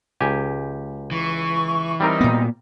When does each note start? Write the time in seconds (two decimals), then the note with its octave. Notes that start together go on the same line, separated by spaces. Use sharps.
0.21 C#2 G4 G#5
1.11 E3 C#6
2.00 G3 C4 D#4 A#4
2.21 A#2 B3